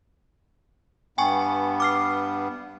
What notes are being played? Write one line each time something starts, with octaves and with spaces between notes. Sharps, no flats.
G2 B3 G5 G#5 C#6
D6 F6 C7